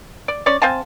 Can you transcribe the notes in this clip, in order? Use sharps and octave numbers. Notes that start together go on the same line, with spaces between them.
D5
C#4 C#5 D5
C4 F5 G#5 A5